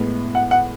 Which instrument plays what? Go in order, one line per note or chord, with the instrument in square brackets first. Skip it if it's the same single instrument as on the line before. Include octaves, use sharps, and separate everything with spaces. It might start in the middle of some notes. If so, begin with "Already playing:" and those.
Already playing: [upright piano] A2 G#3 B3
[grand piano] F#5
F#5